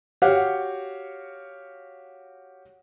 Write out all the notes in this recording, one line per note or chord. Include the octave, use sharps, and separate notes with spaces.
F#4 G4 C#5 F5 F#5